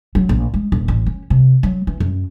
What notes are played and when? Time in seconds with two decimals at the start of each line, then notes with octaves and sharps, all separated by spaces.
0.15 F#3
0.29 A#1
0.54 G#3
0.72 D#1
0.88 A1
1.06 C#4
1.30 C3
1.63 F#3
1.87 E3
2.00 F#2